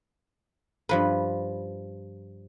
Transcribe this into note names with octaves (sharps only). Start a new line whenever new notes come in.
G2 F3 B4